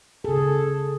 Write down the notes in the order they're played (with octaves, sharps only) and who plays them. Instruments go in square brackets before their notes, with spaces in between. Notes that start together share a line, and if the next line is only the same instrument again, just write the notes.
[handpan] C#3 G#4 [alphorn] A4